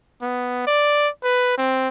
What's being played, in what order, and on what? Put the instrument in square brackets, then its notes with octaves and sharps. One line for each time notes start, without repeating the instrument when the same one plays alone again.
[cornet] B3
D5
B4
C4